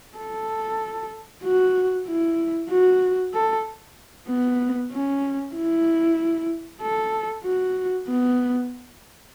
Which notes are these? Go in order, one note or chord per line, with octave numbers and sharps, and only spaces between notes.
A4
F#4
E4
F#4
A4
B3
C#4
E4
A4
F#4
B3